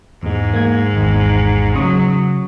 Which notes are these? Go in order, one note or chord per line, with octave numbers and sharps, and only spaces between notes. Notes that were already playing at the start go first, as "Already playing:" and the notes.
E2 G#2 G#3
A#3 G#6
G#1 E2
C#3 F#3 C#6 D#6